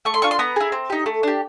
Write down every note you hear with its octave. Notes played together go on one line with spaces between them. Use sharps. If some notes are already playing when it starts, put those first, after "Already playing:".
A3 C#6
C6
D4 F4 C#6
C6
B3 A#5
E4 G#4
C4
D#4 G4
A3
D4 G4